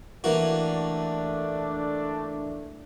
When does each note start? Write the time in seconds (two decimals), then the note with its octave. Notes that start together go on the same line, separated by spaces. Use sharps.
0.24 E3 A3 A#3 D4 F#4